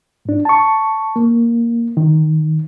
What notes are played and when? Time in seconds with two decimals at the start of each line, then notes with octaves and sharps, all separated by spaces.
0.25 G#2 D4
0.45 A5 C#6
1.16 A#3
1.97 D#3